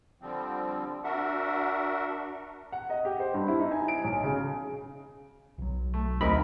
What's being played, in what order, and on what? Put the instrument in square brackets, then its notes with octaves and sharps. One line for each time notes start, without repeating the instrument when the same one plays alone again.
[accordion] D3 F3 G3 C4
D4 F#4 A#4 E5 F#5
[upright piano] F#5
D#5
G4
C5
G2
E4
D#4
G#5
D7
B1
C#3
[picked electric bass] B1 F#3
[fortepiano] A3
[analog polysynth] D2 [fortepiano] C4 D#4 A#4 [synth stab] B5